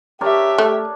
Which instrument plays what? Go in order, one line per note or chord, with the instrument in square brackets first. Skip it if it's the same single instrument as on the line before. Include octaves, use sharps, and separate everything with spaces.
[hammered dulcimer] D4 A#4 C#5 [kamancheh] G4 E5
[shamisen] A3